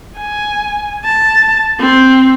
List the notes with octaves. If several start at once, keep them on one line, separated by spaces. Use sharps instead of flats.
G#5
A5
C4